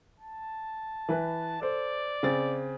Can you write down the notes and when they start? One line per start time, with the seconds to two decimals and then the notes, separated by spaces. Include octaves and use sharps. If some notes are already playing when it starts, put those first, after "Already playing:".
0.20 A5
1.09 E3 B4
1.62 A4 C5 D5
2.23 C#3 C4 A6